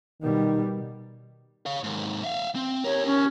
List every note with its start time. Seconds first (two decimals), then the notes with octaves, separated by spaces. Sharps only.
0.22 B2 D#3 G3
1.66 C#5 F5
1.84 D#2 G#2
2.24 E5 F5
2.55 C4
2.84 G4 A#4 C#5
3.06 C#4